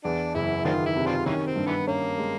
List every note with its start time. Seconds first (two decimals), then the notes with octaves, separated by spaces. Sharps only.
0.04 E2 D4
0.34 F#1 E4
0.65 D#3 C4 D4 F4
0.86 E4
0.96 C3
1.06 C4 D4 F4
1.26 D#3 E3 A#3 C#4
1.46 C4
1.56 G2
1.67 D3 E3 B3
1.87 A#3 C#4
2.18 G#3